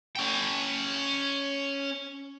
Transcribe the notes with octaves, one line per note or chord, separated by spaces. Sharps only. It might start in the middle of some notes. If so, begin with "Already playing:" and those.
C#4 G5